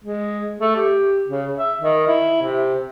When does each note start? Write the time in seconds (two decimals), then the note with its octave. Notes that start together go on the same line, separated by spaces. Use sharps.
0.04 G#3
0.60 A3
0.76 G4
1.28 C#3
1.57 E5
1.82 D#3
2.07 E4
2.42 C3